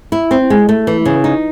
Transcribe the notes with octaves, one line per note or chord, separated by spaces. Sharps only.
E4
C4
G#3
A3
E3
C#3
D#4